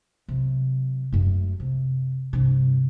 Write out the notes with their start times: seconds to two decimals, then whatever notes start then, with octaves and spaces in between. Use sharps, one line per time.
0.28 C3 F#3
1.13 F#2 A3
1.60 C3
2.33 G2 C3